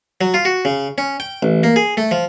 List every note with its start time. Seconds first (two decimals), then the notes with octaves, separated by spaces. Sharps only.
0.21 F#3
0.34 F4
0.45 F#4
0.65 C#3
0.98 C#4
1.20 G5
1.43 A1
1.63 A#3
1.76 G#4
1.97 A3
2.11 F3